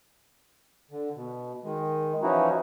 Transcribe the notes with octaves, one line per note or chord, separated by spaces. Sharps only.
D3
B2
D#3 G#3
E3 F3 C#4 D#4 E4 F#4